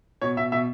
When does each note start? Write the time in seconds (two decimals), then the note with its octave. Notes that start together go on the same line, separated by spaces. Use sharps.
0.21 B2 C#5
0.37 B2 E5
0.52 B2 E5